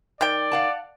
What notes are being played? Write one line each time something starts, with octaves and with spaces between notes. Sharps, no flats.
D#3 D5 G5
F5 F#5 A5